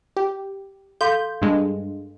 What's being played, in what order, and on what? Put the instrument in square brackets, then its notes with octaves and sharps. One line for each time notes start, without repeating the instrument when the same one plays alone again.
[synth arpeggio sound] G4
[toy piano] A4 F5 C6 [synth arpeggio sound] G6
[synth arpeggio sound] G2 G#3